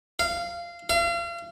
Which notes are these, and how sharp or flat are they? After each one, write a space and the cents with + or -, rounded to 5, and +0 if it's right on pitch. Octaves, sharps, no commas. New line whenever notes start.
F5 -15
F5 -35